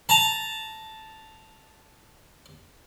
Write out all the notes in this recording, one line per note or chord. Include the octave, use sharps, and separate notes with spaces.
A5 A#5